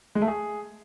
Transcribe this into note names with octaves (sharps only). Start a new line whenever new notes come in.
G#3
A3
G#4